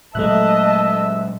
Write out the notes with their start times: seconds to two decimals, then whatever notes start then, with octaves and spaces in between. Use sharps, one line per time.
0.15 A#2 F#3 G#3 A3 D#5 E5 A5 F#6